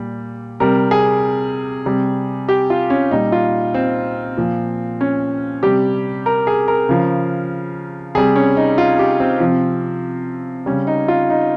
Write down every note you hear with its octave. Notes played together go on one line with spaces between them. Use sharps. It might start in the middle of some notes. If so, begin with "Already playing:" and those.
Already playing: A#2 G3
C3 G3 A#4
G#4
C3 G3
G4
F4
C#4
A#2 G3 D#4
F4
C4
A#2 F3
C#4
C3 G3 G4
A#4
G#4
A#4
C#3 F3
C3 G3 G#4
C#4
D#4
F4
G4
C4
C3 F3
C#3 G3 C#4
D#4
F4
D#4